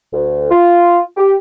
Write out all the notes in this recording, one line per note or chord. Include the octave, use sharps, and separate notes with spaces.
D2
F4
G4